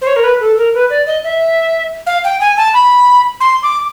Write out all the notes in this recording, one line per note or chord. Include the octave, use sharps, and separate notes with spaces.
C5
C#5
A#4
B4
A4
A#4
B4
D5
D#5
E5
F5
G5
G#5
A5
B5
C6
D6